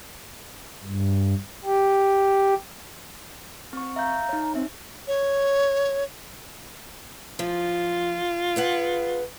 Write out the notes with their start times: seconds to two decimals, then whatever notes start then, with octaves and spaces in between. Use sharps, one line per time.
0.84 G2
1.65 G4
3.73 C4 C#6
3.96 E5 F5 A#5 G6
4.29 D#4 C#5
4.55 C4 E5
5.07 C#5
7.39 F3 F4
8.56 G#4 B4 F#5